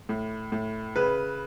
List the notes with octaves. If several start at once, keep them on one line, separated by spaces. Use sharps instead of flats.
A2
A2
C#3 B4